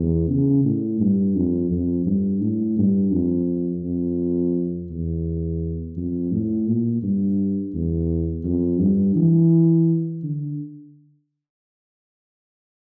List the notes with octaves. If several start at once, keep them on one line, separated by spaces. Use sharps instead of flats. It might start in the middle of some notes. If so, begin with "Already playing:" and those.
Already playing: E2
C#3
A2
G2
F2
F2
G2
A2
G2
F2
F2
E2
F2
A2
A#2
G2
E2
F2
G2
E3
D3